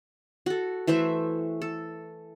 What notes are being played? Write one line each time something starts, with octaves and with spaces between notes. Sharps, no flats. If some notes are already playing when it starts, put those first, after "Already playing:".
F#4 A4
E3 A3 C5 E5
A4